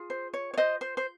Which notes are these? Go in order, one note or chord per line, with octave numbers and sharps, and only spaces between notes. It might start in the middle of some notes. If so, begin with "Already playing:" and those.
Already playing: F4 G#4
C5
C#5
C#5
C5 D#5
C5
C5